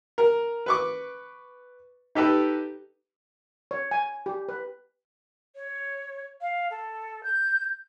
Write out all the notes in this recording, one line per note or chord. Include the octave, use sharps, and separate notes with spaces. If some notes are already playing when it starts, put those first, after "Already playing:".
A#4
B4 C#6 D6
D#4 G4 A4 B4
C#5
G#5
G4
B4
C#5
F5
A4
G6